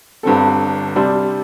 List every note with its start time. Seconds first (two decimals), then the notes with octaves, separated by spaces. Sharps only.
0.23 G1 G2 D3 C4 A4
0.96 C3 G3 D4 C5